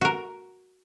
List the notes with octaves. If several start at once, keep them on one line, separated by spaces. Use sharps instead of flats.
F#4 A#4